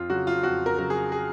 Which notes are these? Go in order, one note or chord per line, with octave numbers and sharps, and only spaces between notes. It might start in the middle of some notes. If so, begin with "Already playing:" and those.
Already playing: F2 F4
C#3 F#3 F#4
F4
F2 F#4
A#4
C#3 F#3 A#4
G#4
G#4